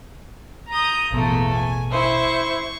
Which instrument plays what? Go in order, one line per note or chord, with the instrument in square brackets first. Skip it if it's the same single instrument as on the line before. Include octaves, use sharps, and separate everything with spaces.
[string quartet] A#5 D#6 G6
[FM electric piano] A1 B2 [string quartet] E2 A3 A#3
[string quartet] G#5
[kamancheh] E4 C5 [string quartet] C#6